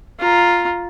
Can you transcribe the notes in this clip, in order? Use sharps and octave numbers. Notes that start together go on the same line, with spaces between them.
F4 A#5